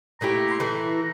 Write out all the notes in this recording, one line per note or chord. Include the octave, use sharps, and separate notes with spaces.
A#2 A3 E4 G4 A#5
C6
E3 A3 E4 A#5